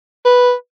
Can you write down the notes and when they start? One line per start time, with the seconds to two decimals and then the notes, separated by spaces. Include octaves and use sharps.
0.25 B4